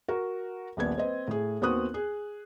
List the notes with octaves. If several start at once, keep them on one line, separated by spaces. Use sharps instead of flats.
F#4 A#4
D#1 A#1 B3 G#6
C4 B4 D#5
A2 G#4
D#2 B3 C4 F#4 D#6 F#6
G#4